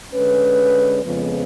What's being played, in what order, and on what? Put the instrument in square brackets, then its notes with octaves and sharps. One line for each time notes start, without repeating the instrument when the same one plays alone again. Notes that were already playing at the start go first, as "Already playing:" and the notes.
[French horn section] D3 G#3 C#4 B4
F2 C#3 F3 G#3 B3 B4